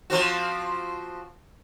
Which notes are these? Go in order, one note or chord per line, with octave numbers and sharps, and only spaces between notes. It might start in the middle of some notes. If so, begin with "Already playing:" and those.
F3 C4 F#4